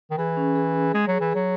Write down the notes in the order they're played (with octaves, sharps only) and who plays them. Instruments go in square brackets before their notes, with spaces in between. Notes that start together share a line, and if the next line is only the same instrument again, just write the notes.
[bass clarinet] D#3
[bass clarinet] E3 [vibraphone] G#4
[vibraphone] C#4
G#4
G#4
[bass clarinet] G#3 [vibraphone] G#4
[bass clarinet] F#3 [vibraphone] G#4
[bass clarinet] E3
[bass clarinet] F#3 [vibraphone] G#4